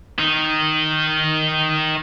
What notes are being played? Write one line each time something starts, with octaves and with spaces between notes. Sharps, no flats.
D#3 D#4